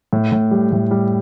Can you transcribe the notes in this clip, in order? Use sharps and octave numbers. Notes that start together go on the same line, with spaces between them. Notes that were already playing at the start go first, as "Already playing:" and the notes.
A2
A2
G3
A2
G3